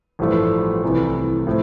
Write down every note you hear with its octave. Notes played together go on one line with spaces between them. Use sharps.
A1 G2 F3 A3
C2 C3 E3 A3
A2 F3 A3